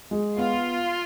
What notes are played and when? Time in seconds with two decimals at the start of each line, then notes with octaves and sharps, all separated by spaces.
0.11 G#3
0.38 B3 F4